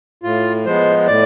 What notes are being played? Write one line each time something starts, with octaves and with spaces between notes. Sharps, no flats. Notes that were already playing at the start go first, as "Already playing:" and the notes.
A2 F4
F3 G#3 B3 C5
A2 D5